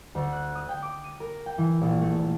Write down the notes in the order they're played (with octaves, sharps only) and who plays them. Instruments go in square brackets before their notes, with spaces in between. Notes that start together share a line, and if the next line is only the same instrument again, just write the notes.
[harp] D2
F#6
D#6
G5
D6
D#7
A#4
G5
E3
A#1
A3
A#1